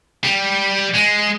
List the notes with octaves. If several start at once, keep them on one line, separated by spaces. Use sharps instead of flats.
G3
G#3